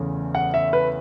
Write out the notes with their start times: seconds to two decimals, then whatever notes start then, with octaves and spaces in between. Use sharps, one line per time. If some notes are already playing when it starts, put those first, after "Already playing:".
Already playing: E2 C#3 A3 C#4
0.35 F#5
0.54 E5
0.73 B4